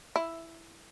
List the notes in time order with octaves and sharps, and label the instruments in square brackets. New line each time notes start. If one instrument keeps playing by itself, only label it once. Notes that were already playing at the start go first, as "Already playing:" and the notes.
[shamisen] E4